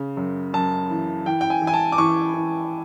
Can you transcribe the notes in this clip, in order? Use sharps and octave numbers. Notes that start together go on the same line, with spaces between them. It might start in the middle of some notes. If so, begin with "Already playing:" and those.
Already playing: C#3
F#2
F#2 A5
E3
E3 G5
G5
G#5
E3
G#5
A5
D6
E3 C#6
E3